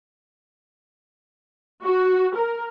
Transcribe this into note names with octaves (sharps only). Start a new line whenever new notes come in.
F#4
A#4